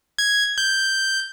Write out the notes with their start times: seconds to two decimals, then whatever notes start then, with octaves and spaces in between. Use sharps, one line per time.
0.19 G#6
0.58 G6